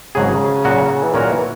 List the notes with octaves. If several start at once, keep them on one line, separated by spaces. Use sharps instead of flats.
G#1 G#2 C#3 F#3 C#4 G#4
A#2 F#3 C#4 F#4
E3
A#2 D#3 F#3 C#4 F#4 A#4
E3